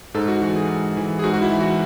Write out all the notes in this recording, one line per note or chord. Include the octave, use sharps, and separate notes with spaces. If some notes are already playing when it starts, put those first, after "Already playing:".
G#2 A4
F#4
E3 F#4
A4
G#4
G#2
E3
G#4
G#2 F#4
F#4
E4
E3
F#4